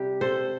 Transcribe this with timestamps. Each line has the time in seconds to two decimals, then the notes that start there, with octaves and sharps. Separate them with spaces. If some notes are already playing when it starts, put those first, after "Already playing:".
Already playing: C3 G3 G4
0.21 A4 C5